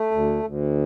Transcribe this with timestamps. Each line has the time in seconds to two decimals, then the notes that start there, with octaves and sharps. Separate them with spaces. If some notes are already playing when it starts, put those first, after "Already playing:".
Already playing: A3
0.11 D2
0.43 D2